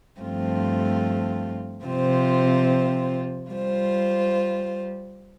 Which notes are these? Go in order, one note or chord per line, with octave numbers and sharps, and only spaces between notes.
G2 F3 A3 C4 F4
C3 F3 C4 F4 C5
G3 F4 C5